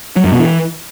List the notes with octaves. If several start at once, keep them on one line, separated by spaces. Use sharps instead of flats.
F#3
F#2
B2
E3